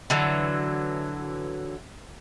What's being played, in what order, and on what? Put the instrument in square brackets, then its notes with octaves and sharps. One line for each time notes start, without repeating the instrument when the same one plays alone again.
[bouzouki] D3 E3 F#3